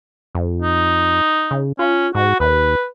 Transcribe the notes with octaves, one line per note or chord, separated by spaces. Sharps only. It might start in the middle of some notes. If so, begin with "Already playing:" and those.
F2
D#4
C#3
C#4 F4
G#2 F#4
D#2 B4